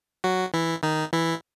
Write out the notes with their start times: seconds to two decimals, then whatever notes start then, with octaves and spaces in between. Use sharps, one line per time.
0.24 F#3 F#4
0.54 E3 E4
0.83 D#3 D#4
1.13 E3 E4